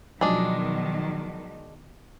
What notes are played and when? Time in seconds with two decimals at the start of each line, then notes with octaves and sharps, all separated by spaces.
0.21 B2 D#3 F3 F#3 G#3 D4